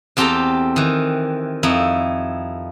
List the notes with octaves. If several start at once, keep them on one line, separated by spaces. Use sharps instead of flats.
E2 C4 G4 A4 A#5
D#3 E3
F2 D#4 E4